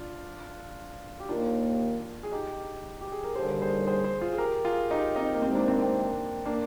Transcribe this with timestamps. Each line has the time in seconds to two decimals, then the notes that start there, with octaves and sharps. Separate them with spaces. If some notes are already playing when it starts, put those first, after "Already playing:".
Already playing: D4 F4
1.20 G4
1.29 D#2 D#3 A#3 D4 F4
2.23 G#4
2.32 D#4 G4
3.01 G4
3.12 G#4
3.24 A#4
3.35 D#2 D3 G3 G#4 C5
3.61 G#4 C5
3.87 G#4 C5
4.04 G#4 C5
4.21 F4 G#4
4.33 G#4
4.38 G4 A#4
4.65 F4 G#4
4.90 D#4 G4
5.16 C4 D#4
5.35 A#3
5.42 C3 D#3 G#3 C4 D#4
5.55 A#3 D4
5.68 C4
5.81 C4
6.46 A#3 D4